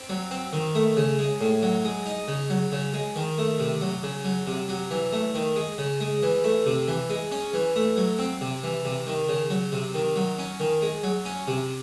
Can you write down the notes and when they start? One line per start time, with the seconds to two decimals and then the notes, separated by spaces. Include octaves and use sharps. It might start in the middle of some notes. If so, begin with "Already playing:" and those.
Already playing: C4
0.09 F#3
0.31 C4
0.53 D#3
0.75 A3
0.97 C#3
1.19 G#3
1.41 A2
1.63 F#3
1.85 G#3
2.06 D#4
2.28 C#3
2.50 F#3
2.72 C#3
2.94 G#3
3.16 D#3
3.38 A3
3.60 C3
3.81 F#3
4.03 C#3
4.25 F#3
4.47 C3
4.69 F#3
4.91 E3
5.13 A3
5.35 D#3
5.56 G#3
5.78 C#3
6.00 G#3
6.23 E3
6.44 A3
6.66 C3
6.88 E3
7.10 G#3
7.32 C#4
7.54 E3
7.76 A3
7.97 F#3
8.19 C4
8.41 C3
8.63 E3
8.85 C3
9.07 D#3
9.29 C#3
9.50 F#3
9.72 C3
9.94 D#3
10.16 F#3
10.39 C#4
10.60 D#3
10.82 G#3
11.03 F#3
11.25 C#4
11.48 C3